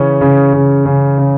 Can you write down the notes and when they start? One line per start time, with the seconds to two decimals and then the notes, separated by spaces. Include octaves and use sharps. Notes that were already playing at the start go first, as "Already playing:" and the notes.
Already playing: C#3 E3 C#4
0.21 C#3
0.53 C#3
0.86 C#3
1.18 C#3